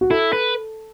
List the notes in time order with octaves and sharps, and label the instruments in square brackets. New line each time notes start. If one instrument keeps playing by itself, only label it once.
[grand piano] F#4
[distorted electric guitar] E4 [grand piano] A4
[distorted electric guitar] B4